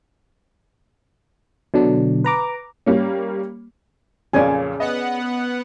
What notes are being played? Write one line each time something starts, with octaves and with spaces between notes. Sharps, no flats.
B2 D3 F#3 D4
B4 A#5 D6
G3 A#3 C#4
F2 A#2 C#3 C#4 G#4 C#5 D5 G#5
B3 D#5 F#5